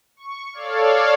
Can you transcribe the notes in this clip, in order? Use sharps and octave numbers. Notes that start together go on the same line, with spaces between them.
C#6
A4 C#5 D5 F5